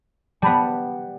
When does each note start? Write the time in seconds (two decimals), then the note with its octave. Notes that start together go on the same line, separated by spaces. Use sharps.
0.42 G3 B3 A5 B5